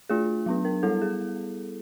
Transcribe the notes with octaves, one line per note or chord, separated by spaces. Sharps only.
A3 D4 F4 G#4
F#3 B3 D4
A#4
G3 B3 E4 A4
G#4